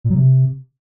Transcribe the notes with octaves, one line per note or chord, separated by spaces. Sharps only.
A#2
F#3
C3